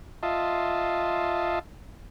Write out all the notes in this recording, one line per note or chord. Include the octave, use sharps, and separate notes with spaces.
F4 D#5 E5 A5 C6